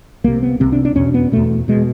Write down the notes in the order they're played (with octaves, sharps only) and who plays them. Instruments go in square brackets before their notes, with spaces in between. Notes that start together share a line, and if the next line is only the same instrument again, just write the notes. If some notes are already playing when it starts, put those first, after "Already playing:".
[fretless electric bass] C2 C3 A#3
B3
C2 C3 C4
D4
D4
E2 B2 C#4
B3
E2 B2 A3
B2 G#3